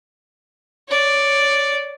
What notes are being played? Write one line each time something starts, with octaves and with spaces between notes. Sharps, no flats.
C#5 D5